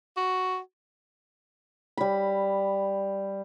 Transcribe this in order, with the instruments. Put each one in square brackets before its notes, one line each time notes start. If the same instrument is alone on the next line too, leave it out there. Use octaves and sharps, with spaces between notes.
[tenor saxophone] F#4
[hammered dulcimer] G3 B5